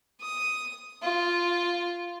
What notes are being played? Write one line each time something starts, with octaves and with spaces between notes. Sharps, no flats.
D#6
F4